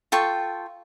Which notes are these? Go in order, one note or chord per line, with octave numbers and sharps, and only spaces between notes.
F4 A4 G5 C#6